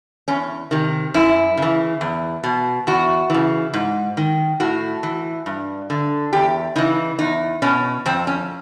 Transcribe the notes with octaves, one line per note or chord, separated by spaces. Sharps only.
E2 C#4
C3 D#3
F#2 E4
C#3 E3
E2
B2
E2 F#4
C#3 E3
G#2
D#3
A2 F#4
E3
G2
D3
E2 G4
C#3 E3 D#4
E2 D#4
B2 C#4
F2 C4
C#4